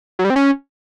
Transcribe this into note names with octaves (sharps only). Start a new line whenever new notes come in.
F#3
G3
C4
C#4